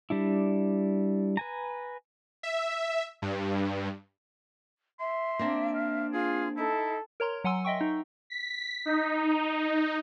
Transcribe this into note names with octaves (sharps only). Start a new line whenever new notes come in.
G3 D4 E4
B4 G#5 A#5
E5
G2
E5 C6
A#3 C4 D4
F5
F4 G#4
D#4 E4 A4
A#4 C#5 A#5 C6
F#3 F#5 G#5 C6 E6
D#5 E5 G5 C#6
D#4
B6
D#4